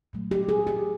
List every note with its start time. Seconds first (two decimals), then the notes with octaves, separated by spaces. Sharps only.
0.13 A#2 F#3 A3
0.31 G4
0.49 G#4
0.67 G4